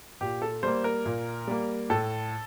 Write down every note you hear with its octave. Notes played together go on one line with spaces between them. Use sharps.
A#2 G4
A4
G3 A#3 C5
A#4
A#2
G3 A#3
A2 A4